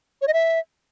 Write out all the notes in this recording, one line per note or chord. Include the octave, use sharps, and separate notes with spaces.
C#5
D#5
E5